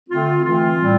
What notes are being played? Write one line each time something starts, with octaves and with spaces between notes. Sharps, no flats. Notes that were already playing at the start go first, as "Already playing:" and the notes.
D3 A3 C4 F4
E3 A3 C4 F4
A2 G3 C4